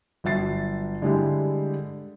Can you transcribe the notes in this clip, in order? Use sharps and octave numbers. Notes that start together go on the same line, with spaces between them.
G1 F#3 E5 A6 C7
D3 G3 G#3 E4 G4